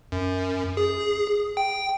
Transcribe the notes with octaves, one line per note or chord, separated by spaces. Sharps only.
F#2
G#4
G5